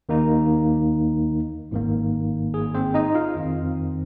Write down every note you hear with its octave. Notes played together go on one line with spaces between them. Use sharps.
D#2 D#3 A#3 D#4
G#1 G#2 D#3 A#3
G#4
C4 C5
D#4 D#5
F4 F5
F2 D#3 C4